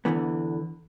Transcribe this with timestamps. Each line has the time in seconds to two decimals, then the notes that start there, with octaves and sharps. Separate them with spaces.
0.05 E2 B2 D3 E3 B3